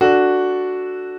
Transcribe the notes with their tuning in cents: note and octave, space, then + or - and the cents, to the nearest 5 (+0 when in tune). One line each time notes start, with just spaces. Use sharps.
D4 +0 F#4 +0 A4 +0